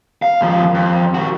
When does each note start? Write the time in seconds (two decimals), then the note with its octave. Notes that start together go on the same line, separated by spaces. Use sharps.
0.22 F5
0.41 D#2 F3
0.74 F2
1.14 D#3 F#4